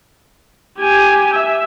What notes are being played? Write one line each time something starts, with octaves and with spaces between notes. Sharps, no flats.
G4 G#5
E5